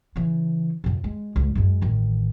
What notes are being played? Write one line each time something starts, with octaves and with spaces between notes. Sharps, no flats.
C#3 E3
F2 C3
G#3
C#2
F#2 G#3
A1 D#3